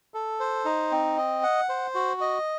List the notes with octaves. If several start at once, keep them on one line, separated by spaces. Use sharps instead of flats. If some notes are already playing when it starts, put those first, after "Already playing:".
A4
C5
D#4
C4
D#5
F#5
C5
F#4
D#5